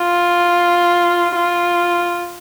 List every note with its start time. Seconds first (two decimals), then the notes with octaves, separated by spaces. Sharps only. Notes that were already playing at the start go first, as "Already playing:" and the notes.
Already playing: F4
1.36 F4